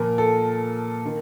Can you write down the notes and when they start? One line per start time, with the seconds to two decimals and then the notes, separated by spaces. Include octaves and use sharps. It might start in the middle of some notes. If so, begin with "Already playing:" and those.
Already playing: A#2 F3 A#4
0.18 A4
1.05 D#3